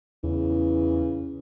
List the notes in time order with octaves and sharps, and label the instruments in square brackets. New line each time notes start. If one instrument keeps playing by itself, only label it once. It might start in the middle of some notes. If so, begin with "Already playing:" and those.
[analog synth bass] E2 [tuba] C#3 [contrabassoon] E3